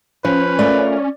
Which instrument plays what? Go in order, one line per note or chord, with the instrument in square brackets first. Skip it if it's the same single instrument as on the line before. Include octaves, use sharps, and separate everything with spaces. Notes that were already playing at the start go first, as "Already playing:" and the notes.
[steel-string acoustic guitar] F3 [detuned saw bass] C#4 [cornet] B4
[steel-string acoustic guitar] A3 F4 A#4 [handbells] D5